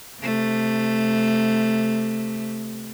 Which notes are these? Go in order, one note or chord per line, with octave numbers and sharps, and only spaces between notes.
C3 A3